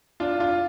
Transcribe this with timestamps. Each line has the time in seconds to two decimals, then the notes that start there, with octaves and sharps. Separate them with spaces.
0.20 D4 F4
0.39 D4 F4